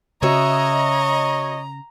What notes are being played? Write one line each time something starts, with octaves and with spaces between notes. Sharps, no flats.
C#3 F#4 C#5 D#5 E5 A#5